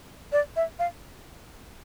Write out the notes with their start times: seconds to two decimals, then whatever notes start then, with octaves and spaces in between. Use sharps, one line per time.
0.32 D5
0.56 E5
0.79 F5